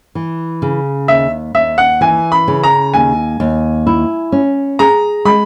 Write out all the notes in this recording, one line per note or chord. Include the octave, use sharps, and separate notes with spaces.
E3
C#3
D#2 E5
D#2 E5
F#5
E3 G#5
B5
C#3
A#5
D#2 G#5
D#2
E4
C#4
G#4 A#5
G#3 B5